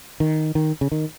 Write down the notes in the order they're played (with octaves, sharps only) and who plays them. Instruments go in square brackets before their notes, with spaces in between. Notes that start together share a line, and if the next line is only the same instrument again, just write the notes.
[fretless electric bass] D#3
D#3
C#3
D#3